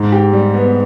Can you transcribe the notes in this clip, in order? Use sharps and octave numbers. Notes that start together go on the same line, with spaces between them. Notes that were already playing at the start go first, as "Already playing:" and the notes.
Already playing: G#2
G4
G3
B3